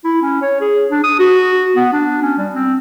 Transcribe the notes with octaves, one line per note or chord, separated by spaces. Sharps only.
E4
C#4
C#5
G#4
D4
D#6
F#4
B3
D4
C#4
G3
C4